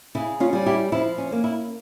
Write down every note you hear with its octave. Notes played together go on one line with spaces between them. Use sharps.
C#3 E4
C#4 F4
G3 C#4
E4 G4
F3 E4
C#4
A#3 C#4
E4